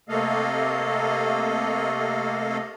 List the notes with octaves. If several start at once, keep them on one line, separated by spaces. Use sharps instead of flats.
C3 A3 A#3 A4 D#5 F5